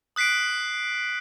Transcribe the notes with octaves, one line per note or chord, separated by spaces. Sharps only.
D#6 F#6 B6 C7 D7